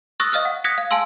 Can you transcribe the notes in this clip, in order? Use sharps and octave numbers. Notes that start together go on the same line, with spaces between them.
C#6 D#6 E6 F#6 A6 A#6
D#5 F5 D#6 F6 F#6
F#5
D#6 F#6 G#6 A#6 B6 C#7
F5
F5 G#5 A5 C6 E6